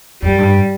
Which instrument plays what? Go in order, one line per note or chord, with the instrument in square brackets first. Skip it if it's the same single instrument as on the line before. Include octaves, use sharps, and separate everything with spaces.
[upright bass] F#2 [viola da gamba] G3
[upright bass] G2